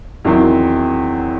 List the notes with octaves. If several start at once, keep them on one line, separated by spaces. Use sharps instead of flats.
E2 D#3 F#3 C4 E4